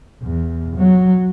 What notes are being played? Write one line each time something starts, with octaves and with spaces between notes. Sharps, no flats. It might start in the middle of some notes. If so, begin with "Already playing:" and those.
E2
F#3